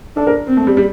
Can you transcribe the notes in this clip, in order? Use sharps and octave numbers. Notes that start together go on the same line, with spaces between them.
D4 A4
A#4
C4
A3
G3
G3